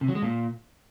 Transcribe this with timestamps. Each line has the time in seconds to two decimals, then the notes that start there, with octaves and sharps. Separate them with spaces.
0.01 C3
0.08 F#3
0.15 G#3
0.22 A#2